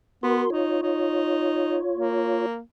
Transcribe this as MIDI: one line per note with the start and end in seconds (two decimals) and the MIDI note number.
0.23 0.44 59
0.23 0.50 66
0.23 0.50 70
0.23 0.50 84
0.50 0.78 63
0.50 2.46 65
0.50 2.46 73
0.83 1.79 63
1.95 2.60 58